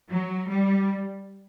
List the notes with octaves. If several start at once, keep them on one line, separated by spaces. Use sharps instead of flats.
F#3
G3